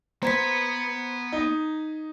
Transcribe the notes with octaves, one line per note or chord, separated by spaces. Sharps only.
B3 B4 C5 A#5 G#6 B6
D#4 D#5